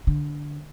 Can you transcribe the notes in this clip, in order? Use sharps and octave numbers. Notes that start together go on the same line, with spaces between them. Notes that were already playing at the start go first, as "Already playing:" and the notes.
D3